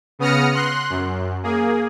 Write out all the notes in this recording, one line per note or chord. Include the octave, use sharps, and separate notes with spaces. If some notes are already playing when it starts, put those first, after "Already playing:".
C#3 B3 D#6 F6 A#6 C#7
C6 F#6
F#2
A#3 G#4